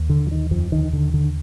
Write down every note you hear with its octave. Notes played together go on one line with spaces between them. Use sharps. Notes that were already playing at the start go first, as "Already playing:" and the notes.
Already playing: D#2
D3
F3
D#3
F2 F3
D#2 D3 D#3
D3
D3